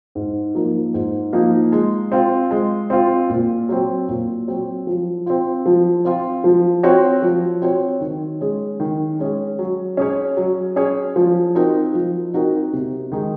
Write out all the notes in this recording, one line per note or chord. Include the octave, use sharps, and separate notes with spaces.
G#2
F3 A#3 D#4 A#4
G#2
F3 A#3 D#4 A#4
G#3
C4 F4
G#3
C4 F4
A#2
F#3 C4
A#2
F#3 C4
F3
C4 F4
F3
C4 F4
F3
C4 F#4 C#5
F3
C4 F#4 C#5
D#3
G#3 C#4 G#4
D#3
G#3 C#4 G#4
F#3
C#4 G#4 C#5
F#3
C#4 G#4 C#5
F3
C4 D#4 F#4 A#4
F3
C4 D#4 F#4 A#4
C3
D#3 G#3 D#4 G#4